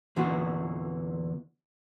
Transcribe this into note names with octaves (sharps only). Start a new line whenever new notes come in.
E2 A#2 D3 E3 F#4